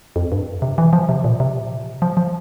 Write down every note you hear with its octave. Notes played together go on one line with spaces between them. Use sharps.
F2
G2
C3
E3
F3
C3
A#2
C3
F3
F3